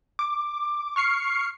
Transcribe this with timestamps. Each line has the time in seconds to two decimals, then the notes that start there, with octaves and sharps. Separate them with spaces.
0.19 D6
0.96 C#6 F6 C7 C#7